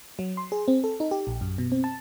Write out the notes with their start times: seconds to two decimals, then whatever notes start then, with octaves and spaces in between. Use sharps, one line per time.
0.19 F#3
0.37 C6
0.52 G#4
0.68 C4
0.84 A4
1.00 D#4
1.11 G4
1.27 A#1
1.41 F#2
1.58 B2
1.72 C4
1.84 A5